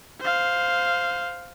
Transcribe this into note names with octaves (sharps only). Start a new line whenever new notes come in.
C5 F5